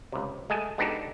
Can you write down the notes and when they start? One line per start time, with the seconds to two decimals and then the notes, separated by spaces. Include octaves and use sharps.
0.12 C#2 C3
0.50 G#3 A3 D#5 G#5 A5
0.78 G#3 B3 D4 D#4 G4 A4